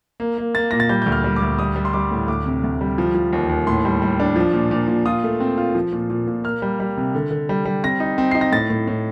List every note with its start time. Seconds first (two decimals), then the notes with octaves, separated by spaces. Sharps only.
0.20 A#3
0.38 A#3
0.55 A#3 A6
0.71 A#2 A#6
0.80 A6
0.89 G3 G6
1.02 D2 G6
1.12 F6
1.24 G3
1.36 D6
1.42 D2
1.59 G3 D#6
1.76 G3
1.85 C6
1.93 G3 D6
2.11 A2
2.28 D2 D6
2.46 C3
2.63 D2
2.81 G3
2.98 F3
3.14 F3
3.33 D#2
3.49 D#2
3.67 A2 C6
3.85 G3
4.02 G3
4.20 D4
4.36 F3
4.53 A#2
4.71 A#2
4.88 A#2
5.06 F4 D#6
5.24 A3
5.40 C4
5.57 F4
5.75 F3
5.93 A#2
6.10 A#2
6.27 A#2
6.44 A#3 F6
6.62 G3
6.80 G3
6.97 C3
7.15 D3
7.31 D3
7.49 G3
7.65 G3
7.84 C4 A#6
8.00 D#4
8.18 C4
8.31 D#4 C7
8.41 A#6
8.52 A2 A6
8.70 A2
8.88 A2